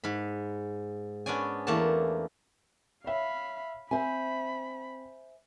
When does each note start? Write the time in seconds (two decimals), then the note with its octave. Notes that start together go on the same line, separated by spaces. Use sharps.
0.04 G#2 B5
1.26 B3 C#4 D4 D5 G#5
1.67 E2 A3 A#3 F#5 A5
3.04 C#5 E5 F5 B5
3.91 C4 C5 E5 G#5 B5